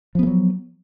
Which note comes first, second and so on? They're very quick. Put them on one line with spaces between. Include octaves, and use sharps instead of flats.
F3 B3 A3 F#3